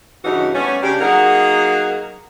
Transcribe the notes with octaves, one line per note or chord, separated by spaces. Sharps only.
G2 C#3 E3 C#4 D#4 F#4
G3 A3 B3 C#4
C#3 D4 G4
F#3 A#3 D#4 G#4 A#4 F#5